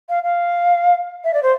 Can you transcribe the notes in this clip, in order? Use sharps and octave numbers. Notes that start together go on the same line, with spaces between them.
F5
F5
E5
D5
C5